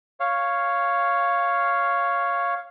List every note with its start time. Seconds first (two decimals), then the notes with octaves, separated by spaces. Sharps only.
0.20 C#5 F5